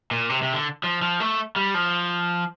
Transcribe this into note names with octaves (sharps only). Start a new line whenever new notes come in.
A#2
C3
C3
D3
F3
F3
A3
G3
F3